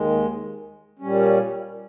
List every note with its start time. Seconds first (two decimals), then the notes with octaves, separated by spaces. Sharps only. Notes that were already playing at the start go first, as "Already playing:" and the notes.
Already playing: D#2 D#3 G#3
0.99 A#2 G3 C#4